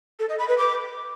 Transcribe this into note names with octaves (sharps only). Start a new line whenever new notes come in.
A4
D#5
B5
B4
D6